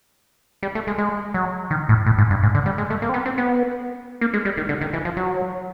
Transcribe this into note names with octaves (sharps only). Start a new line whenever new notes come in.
G3
A3
G#3
G#3
F#3
D#3
A2
A2
G#2
G2
G#2
D3
G3
G#3
A3
A#3
C4
B3
C4
B3
A#3
G#3
G3
D#3
D3
D#3
E3
F3
F#3